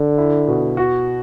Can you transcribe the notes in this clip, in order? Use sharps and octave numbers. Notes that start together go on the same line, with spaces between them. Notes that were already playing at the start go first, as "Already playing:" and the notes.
Already playing: D3
E4
B2
F#4